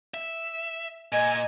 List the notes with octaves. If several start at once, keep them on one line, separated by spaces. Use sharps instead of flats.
E5
A#2 D#5 G#5